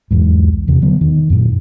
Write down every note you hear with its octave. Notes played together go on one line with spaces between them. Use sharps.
B1 E2 G#2
E2 C3
D3 F#3 B3
D#3
F#2 A#2